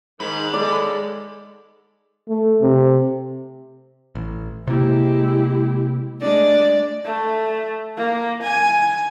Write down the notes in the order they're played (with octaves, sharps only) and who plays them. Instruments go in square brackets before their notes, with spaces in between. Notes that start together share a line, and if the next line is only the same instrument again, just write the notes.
[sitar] G#2 [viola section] D#3 G#3 [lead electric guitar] B5
[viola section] G#3 A4 [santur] D5
[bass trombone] A3
C3
[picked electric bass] A1
[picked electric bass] C3 A#3 [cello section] G#3 [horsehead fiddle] E4 G4
[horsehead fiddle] G#3 D4 [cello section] A3 [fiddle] D5
[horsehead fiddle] A3
A#3
G#5